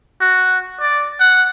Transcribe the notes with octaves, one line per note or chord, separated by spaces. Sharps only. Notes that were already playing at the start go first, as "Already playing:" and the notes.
F#4
D5
F#5